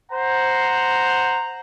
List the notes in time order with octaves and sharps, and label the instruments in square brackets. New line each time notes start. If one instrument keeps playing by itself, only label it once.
[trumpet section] C5 F#5 A#5